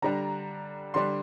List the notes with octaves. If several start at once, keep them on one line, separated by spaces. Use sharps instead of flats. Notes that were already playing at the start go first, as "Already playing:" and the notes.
D3 G3 D4 A#5
D3 G3 D4 C6